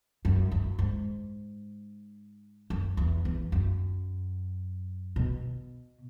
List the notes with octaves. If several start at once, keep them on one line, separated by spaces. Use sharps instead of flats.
F#2
F#2
G#2
F#2
E2
E2
F#2
B2